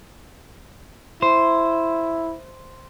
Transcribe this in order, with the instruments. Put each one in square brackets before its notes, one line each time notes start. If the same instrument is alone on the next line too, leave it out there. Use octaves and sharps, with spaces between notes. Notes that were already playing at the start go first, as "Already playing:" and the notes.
[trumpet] E4 [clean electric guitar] C5